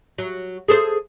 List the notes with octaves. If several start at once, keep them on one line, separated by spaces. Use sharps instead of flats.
F#3
G#4 A4 C5